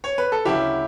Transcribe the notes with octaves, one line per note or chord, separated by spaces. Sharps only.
C#5
B4
A4
D2 C#3 F#3 E4 G4